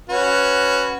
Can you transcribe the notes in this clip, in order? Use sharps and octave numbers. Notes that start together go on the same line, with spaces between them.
C#4 F#4 B4